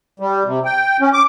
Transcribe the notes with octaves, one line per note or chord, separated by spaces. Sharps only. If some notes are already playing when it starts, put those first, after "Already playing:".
G3
C3
G5
C#4
D6